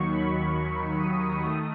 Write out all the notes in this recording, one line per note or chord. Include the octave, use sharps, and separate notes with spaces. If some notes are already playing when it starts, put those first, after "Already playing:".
Already playing: D#2 D#3 F#3 C#6
B5
C#6
D#6
D#3 A3 D#6